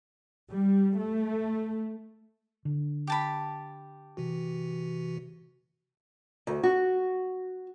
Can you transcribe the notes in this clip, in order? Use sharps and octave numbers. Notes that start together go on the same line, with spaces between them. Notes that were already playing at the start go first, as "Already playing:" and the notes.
G3
A3
D3
G4 A5 B5
C3 E3 F#4
D2
F#4